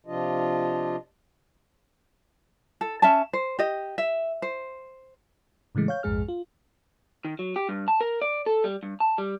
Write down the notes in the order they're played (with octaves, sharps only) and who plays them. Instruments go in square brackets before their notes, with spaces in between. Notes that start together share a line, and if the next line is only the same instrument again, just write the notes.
[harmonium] C3 F3 D4 F4 D#5
[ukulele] A4
C#4 E5 A5
C5
G4 D#5
E5
C5
[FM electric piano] A2 C#3 E3 G#3 A3
C#5 F5 G6
A#1 F2 G#2 G#3 G#4 F6
F4
[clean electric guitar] D#3
F#3
G4
G2
A5
A#4
D5
A4
G3
G2
A5
G3